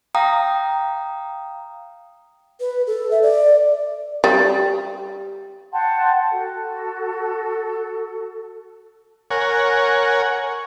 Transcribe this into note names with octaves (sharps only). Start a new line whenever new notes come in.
F5 G5 A#5 D#6
B4
A4
E5
D5
G3
F#5 G5 A5 C6
F#4 A4
A#4 C#5 F#5 G#5